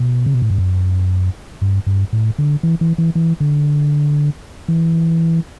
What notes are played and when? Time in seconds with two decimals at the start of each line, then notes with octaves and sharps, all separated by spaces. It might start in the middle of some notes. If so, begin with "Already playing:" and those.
Already playing: B2
0.26 C#3
0.34 B2
0.42 A2
0.50 G2
0.58 F#2
1.62 G2
1.87 G2
2.13 A2
2.38 D3
2.63 E3
2.81 E3
2.98 E3
3.15 E3
3.40 D3
4.68 E3